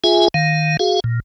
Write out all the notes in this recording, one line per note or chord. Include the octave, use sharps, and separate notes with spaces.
F4 G#4 E5 G#5
D#3 F5
F#4 G#4 F5
A#2